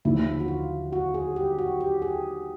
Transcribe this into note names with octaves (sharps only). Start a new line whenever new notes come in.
D#2 D3 F3 A#3 E4
F#4
F4
F#4
G#4
G4
F#4
G4
G#4